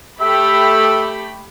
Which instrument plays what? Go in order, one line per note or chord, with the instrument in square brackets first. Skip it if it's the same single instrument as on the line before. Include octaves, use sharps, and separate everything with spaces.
[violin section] A3 G4 B5 [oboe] E5